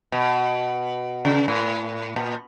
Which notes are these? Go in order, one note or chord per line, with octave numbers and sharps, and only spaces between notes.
B2
C#3
A2
A#2